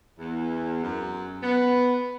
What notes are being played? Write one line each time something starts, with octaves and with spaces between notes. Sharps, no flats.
E2
F#2
B3